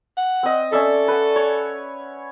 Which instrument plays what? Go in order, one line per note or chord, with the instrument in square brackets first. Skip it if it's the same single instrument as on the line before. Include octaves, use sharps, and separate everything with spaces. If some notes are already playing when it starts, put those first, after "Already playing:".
[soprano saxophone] F#5
[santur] C4 D#5
[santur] C#4 D5 E5 [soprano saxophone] A4
[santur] B4 F#5
C#5